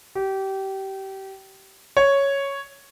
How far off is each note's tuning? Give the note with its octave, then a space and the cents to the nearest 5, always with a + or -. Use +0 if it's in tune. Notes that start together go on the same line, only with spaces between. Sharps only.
G4 -25
C#5 +0